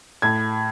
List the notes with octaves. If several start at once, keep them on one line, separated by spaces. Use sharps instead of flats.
A2 G#6